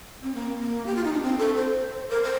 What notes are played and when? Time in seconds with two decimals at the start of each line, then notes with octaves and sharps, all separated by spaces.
0.23 C4
0.34 A#3
0.60 A#3
0.86 G4
0.96 F4
1.04 D#4
1.13 D4
1.23 C4
1.38 A4
1.56 C5
2.10 A#4
2.23 C5